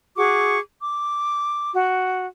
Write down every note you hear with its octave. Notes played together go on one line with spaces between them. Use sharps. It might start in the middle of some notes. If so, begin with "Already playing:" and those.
F#4 G#4 C#6 D6
D6
F#4